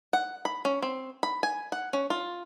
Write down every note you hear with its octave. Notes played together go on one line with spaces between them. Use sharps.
F#5
B5
C#4
C4
B5
G#5
F#5
C#4
F4